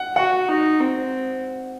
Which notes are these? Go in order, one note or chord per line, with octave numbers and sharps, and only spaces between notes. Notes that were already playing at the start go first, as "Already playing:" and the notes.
Already playing: F#5
F#4 F#5
D#4
C4